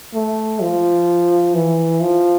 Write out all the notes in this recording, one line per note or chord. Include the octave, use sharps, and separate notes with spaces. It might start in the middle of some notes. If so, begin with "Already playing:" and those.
A3
F3
E3
F3